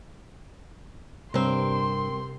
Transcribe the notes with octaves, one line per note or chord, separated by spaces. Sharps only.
G2 C3 C4 A#4 C6